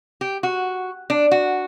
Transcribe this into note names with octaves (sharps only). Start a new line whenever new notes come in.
G4
F#4
D4
F#4